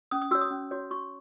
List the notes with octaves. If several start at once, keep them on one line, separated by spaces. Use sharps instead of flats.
C#4 D#6
D#6
F#4 C#5 E6
D#6
C#4
F#4 C#5
F#4 C#6